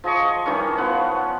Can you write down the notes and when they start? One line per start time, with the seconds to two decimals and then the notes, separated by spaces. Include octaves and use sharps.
0.04 F3 G#4 D#5 C#6
0.46 D#3 E3 G3 C#4
0.78 F3 B3 F#5